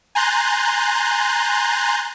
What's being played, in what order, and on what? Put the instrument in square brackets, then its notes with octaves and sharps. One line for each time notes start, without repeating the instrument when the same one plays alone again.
[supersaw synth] G#5 A#5 C6 F#6 G6 A6